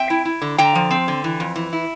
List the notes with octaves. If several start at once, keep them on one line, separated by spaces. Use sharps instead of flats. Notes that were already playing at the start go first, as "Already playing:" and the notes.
Already playing: C4 E5 G5
E4
E4
D3
D3 G5 A#5
F3
C4
D3
E3
F2
E3
E4